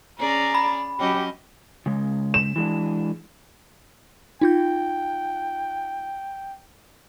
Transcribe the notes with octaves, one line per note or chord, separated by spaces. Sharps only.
C#4 G#4 D5 A#5
B5
F#3 C#4 G4 D#5
C#3 G#3
E7
E3 G#3 D4
D#4 F4 G5 G6